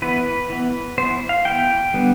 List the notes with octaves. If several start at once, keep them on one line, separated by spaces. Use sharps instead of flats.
E3 B3 B4
E3 B3
E3 B3 C5
F5
E3 B3 G5
D3 G3 B3